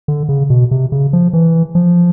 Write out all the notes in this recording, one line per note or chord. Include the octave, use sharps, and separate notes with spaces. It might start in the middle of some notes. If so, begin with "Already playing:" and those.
D3
C#3
B2
C3
C#3
F3
E3
F3